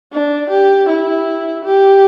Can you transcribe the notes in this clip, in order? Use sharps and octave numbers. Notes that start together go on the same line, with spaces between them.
D4
G4
E4
G4